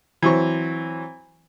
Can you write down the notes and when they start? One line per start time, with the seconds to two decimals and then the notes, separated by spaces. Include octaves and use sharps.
0.22 E3 F#3 C4 C#6